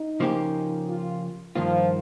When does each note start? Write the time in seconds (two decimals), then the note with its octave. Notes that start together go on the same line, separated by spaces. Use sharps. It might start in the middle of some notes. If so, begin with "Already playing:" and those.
Already playing: D#4
0.20 C#3 F3 A#3 C#4 G4
0.88 F4
1.55 G2 D#3 F3 A#3 F4